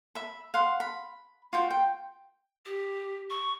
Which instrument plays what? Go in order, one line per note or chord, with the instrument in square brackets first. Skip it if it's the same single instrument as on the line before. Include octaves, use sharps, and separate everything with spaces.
[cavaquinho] E5 B5
F5 F#5 C6
B5
F4 F#4 G5
G5
[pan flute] G4
C#6